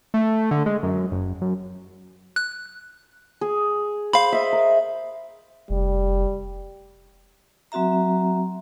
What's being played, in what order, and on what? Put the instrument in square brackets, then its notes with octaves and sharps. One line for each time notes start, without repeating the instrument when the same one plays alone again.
[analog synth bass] A3
D3
G#3
F#2
F#1
F#2
[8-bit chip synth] F#6
[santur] G#4
[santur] C5 [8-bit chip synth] F5 B5
[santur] D#5 E5
A#4
[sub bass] F1 [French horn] G3
[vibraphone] F#3 C4 F#4 E5 A#5